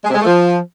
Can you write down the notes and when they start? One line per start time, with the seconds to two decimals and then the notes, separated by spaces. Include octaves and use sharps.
0.03 G#3
0.08 C3
0.14 G#3
0.20 A3
0.25 F3